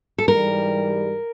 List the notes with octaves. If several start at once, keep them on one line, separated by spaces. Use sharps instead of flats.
A4
G#2 E3 G3 A#4